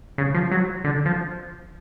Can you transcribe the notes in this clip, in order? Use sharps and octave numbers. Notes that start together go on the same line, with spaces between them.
C#3
F3
F#3
D3
F3